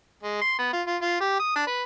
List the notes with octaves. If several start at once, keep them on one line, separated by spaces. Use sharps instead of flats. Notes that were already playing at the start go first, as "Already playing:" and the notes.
G#3
C6
B3
F4
F4
F4
G4
D#6
D4
B4